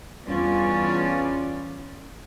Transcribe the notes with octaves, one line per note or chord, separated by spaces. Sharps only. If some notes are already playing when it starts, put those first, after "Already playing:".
E2 G2 B3 C#4 F4 D5